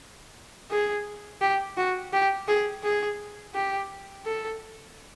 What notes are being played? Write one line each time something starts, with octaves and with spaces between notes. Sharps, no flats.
G#4
G4
F#4
G4
G#4
G#4
G4
A4